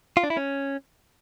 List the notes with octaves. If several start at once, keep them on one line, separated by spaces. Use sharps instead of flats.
F4
D4
E4
C#4